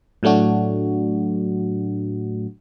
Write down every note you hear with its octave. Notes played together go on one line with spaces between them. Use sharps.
A2 F#3 A3 D4 F#4